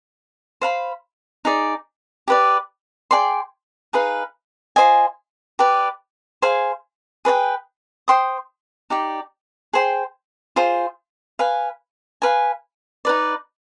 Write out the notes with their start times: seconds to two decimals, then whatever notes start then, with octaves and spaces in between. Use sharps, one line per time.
0.61 C5 F5 B5
1.45 D#4 G#4 D5
2.28 G4 B4 D5
3.11 G#4 D5 G5 C6
3.93 D#4 G#4 B4 F5
4.76 F4 C5 D#5 G#5
5.59 G4 B4 D5
6.42 G#4 C5 F5 G#5
7.25 G#4 B4 D5 G5
8.08 C5 G5 C6 D#6
8.90 D#4 G4 D5
9.73 G#4 C5 G5 C6
10.56 F4 G#4 C5
11.39 B4 F5 G#5
12.22 B4 F5 G#5
13.05 D#4 B4 D5